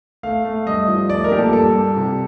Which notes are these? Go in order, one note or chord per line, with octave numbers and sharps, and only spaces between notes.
A3 F5
A3
G2 D#5
F3
A3 D5
A#4
A#2 G4
A4
G2 A4
G2
C3